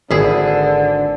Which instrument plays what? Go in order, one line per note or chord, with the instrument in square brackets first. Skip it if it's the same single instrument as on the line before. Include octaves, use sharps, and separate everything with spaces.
[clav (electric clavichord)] G#1 [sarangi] D3 [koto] E4 G#4